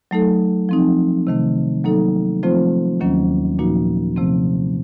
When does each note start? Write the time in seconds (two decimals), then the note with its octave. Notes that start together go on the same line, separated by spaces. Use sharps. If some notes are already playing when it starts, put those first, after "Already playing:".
0.11 F#3 A3 D#4 A4
0.69 F3 C4 D#4
1.27 C3 D#3 A3
1.84 F#3 A#3 D#4 A4
2.43 F3 A3 C4 F4 C5
3.01 D#2 D#3 F#3 A#3 C#4
3.59 A#2 F3 A#3 D#4 F#4
4.16 C3 F3 A3 C4